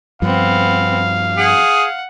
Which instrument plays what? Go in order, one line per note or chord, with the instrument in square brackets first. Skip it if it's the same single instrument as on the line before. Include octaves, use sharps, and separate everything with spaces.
[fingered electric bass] G2 F3 [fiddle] B3 C4 [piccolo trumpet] F5
[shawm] G#4 [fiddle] F#5